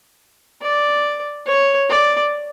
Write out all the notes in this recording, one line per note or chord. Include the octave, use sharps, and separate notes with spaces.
D5
C#5
D5